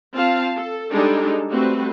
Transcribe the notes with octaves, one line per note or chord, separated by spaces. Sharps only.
C4 F4 F5 A5
A4
G3 G#3 D4 D#4 G#4 A4
G3 A3 C4 F#4 B4